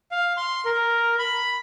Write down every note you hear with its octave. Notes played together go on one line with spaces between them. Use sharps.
F5
C6
A#4
B5